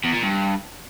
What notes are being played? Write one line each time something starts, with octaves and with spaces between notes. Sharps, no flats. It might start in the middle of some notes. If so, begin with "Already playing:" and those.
E2
A#2
G2